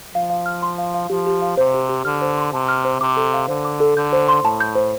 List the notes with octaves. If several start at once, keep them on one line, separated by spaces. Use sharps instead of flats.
F3 F5
F5
F6
C6
F5
F5
F3 G4
G4
F5
C3 C5
G4
G4
D3 F6
C5
C6
C3 A5
F6
C5
C3 D6
A4
F5
D3 C5
D6
A4
D3 G6
C5
C6
A2 A5
G6
C5